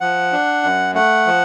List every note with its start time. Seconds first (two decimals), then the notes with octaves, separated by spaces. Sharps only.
0.01 F3 F#5
0.33 D4
0.64 F#2
0.95 A3 F#5
1.27 F3